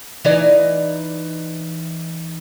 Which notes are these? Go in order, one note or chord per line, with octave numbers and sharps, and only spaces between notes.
E3 D#4 D5